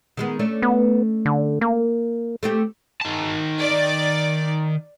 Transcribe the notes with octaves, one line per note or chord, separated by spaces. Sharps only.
D#3 G#3 B3
A3 C#4 D4
B3
D3
A#3
A3 C4 G4
D#3 A5
D5